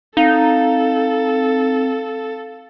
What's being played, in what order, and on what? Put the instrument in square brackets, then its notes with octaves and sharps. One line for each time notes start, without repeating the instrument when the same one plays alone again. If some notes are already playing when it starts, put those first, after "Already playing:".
[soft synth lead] C4 [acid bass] D#4 [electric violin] A4 [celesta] F5